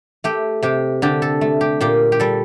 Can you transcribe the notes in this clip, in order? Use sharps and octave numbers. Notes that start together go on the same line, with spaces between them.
A3 G4
C3 G4
D3 G4
A4
A3
G4
A#2 G4
G4
G3 A4